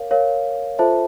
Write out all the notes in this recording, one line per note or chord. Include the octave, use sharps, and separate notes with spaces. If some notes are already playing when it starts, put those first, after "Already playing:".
Already playing: A#4 C#5 F5
A#4 C#5 F5
F4 A4 C5 E5 A5